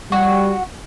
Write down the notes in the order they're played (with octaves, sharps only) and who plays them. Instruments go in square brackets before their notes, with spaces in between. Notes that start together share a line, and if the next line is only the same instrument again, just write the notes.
[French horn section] G3 [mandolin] F#4